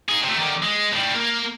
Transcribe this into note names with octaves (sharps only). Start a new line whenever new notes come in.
D#4 G#4
C3 A3
D3 D#3
G#3
A2 G3
A#3 A#4